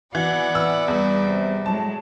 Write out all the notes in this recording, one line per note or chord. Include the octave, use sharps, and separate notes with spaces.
E3 B3 F#4 D5 F#5
E3 E6
E2 G3
C3
A2 F#3 G#3 A5